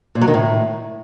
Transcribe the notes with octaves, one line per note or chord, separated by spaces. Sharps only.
A#2
F#3
D#3
A2